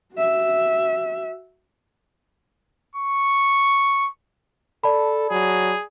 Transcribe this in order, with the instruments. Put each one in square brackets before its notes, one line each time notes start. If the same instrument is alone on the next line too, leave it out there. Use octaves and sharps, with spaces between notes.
[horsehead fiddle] F#4 E5
[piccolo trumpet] C#6
[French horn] A4 [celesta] D5 A5 B5
[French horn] F#3 [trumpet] G#4